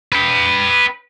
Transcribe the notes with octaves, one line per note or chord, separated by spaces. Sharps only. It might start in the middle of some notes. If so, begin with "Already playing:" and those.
B4 G5